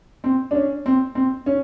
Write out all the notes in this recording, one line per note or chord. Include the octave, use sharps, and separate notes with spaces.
C4
D4
C#4
C4
C4
C#4